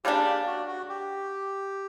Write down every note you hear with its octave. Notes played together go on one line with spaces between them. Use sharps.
C#3 G3 A#3 D4 G4
G4
F#4
F#4
G4